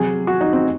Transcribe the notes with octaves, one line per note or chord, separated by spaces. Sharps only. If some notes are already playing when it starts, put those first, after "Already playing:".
Already playing: C3 F#3 G#4
F#4
D#4
C4